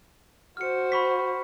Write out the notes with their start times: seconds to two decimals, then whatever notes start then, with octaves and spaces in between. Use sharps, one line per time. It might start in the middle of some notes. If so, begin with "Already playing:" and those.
0.57 F#4 C5 F6 C#7
0.92 B5 C#6 B6